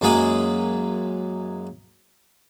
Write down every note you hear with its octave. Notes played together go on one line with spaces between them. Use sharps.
F#2 G#3 A#3 G#4 B5